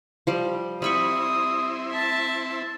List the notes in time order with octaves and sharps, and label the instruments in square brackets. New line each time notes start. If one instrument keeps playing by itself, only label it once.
[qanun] F3 G3
[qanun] G3 B5 C#6 [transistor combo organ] C4 E4 [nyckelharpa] D#6
[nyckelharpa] E5 A5